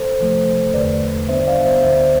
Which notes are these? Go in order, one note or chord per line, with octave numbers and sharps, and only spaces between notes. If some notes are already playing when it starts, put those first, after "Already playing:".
Already playing: A4 C5
C3 F3 A3
E2 D3 A3 B4 D5
G2 D3 G3 B3 D4 C5 E5
D5 F5
C5 E5
D2 D3 G3 C5 E5